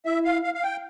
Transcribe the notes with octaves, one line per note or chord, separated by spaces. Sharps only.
E4 E5
F5
F5
F5
G5